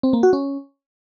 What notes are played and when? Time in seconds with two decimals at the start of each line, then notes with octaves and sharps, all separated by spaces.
0.03 C4
0.13 A#3
0.23 F#4
0.33 C#4